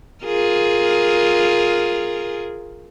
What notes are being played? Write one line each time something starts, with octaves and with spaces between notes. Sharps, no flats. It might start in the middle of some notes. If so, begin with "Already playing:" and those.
F4 G#4 A#4